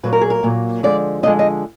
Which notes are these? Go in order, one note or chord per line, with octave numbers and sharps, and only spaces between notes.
A#2 F#3 A#3 B4
A#4
G#4
A#4
A#2 F#3 A#3
D3 F3 G#3 D5
D3 F3 G#3 D#5
D#5